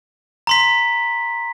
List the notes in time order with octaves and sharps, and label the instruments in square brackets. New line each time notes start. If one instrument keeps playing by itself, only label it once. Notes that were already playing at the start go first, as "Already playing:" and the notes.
[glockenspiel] A#5 C6 B6